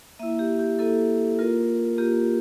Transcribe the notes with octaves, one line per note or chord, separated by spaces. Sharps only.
A#3 E4 E5
G4
G4
A#3 E4 A4
A#3 F4 A#4
A#3 F4 G4